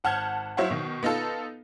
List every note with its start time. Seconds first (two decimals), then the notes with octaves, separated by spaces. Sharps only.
0.04 G#1 F#5 A5 F6 G6 G#6
0.57 F#3 E4 C5 C#5 F5 F#5
0.70 B2 D#3
1.03 B3 D#4 F4 A4